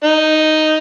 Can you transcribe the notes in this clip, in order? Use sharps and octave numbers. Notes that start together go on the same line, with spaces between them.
D#4